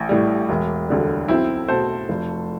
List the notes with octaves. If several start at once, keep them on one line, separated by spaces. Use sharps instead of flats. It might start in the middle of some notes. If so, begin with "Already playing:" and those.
Already playing: A1
A2 G3
E1
D2 D3 G3
B1 C4 E4
B2 A3 A4 C5
F1